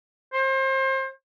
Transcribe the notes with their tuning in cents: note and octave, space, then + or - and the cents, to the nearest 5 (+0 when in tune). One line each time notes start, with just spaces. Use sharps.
C5 +30